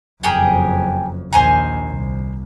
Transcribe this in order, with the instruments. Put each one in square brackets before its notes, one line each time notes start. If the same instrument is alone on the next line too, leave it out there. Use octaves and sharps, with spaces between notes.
[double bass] F#1 F2 [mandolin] G4 G#4 A#4
[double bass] A#1 D#2 [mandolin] C5 G#5 A#5
[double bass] C2